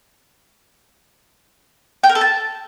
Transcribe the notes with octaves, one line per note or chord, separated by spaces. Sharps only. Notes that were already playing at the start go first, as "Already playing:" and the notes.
G5
A#4
A4
A5